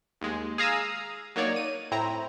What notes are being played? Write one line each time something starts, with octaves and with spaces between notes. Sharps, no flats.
D#2 G#3
G#4 F5 A#5 D#6 E6
F#3 A#3 D#4 C#5 D5
D#7
A2 C4 E4 A#5